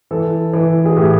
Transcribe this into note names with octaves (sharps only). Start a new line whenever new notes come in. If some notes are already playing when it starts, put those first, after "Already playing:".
E3 A4
E3
G#4
A2 G4